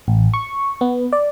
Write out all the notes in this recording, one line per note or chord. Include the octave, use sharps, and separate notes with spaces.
A1
C#6
B3
D5